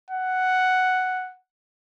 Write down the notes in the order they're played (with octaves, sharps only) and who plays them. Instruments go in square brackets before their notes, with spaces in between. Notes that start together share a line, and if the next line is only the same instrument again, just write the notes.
[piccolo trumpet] F#5